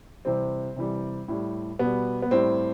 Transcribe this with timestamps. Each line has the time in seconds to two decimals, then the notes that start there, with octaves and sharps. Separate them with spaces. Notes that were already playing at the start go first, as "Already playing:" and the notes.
0.25 C3 E3 G3 C4
0.76 C3 E3 G3
1.28 A2 G3
1.79 B2 G3 B3
2.22 B3
2.31 A2 G3 C4